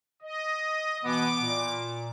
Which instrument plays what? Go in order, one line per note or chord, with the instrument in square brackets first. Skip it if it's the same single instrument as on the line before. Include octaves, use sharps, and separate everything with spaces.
[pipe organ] D#5
[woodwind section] B2 E3 B3 [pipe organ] D6
[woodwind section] A#2